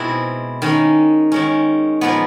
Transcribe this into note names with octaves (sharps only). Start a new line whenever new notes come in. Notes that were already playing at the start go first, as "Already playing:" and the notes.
Already playing: B2 G#3 C4 E4
D#3 G#3 C#4
D#3 G#3 C#4
A#2 F3 G#3 B3